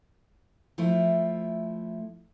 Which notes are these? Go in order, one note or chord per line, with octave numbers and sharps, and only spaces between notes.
F3 A3 E4